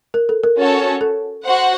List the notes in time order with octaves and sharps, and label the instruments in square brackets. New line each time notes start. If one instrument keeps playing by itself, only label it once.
[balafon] A#4
A4
A#4
[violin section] C#4 F#4 A4 C#5 A5
[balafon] A4
[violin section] F#4 C5 F#5